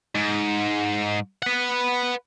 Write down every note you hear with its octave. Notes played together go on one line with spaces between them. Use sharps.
G#2
B4 F#5